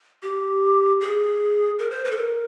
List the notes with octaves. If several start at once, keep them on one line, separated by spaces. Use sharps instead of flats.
G4
G#4
A#4
C5
B4
A4
A#4